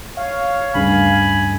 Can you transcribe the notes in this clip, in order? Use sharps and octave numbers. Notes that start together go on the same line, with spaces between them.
C#5 F5
D2 G2 C#3 G#5 B5